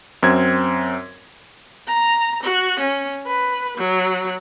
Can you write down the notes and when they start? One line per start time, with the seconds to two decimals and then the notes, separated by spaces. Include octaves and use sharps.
0.23 F#2 C4 G#6
1.88 A#5
2.43 F#4
2.80 C#4
3.26 B4
3.77 F#3